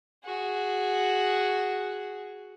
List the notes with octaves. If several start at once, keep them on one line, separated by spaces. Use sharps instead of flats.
F#4 G#4